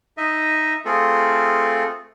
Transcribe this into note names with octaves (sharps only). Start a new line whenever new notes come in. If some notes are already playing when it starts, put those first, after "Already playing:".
D#4 D#5 E5
A3 C4 F4 G#4 A4